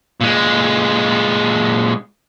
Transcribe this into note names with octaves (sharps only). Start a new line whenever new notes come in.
A#2 G#3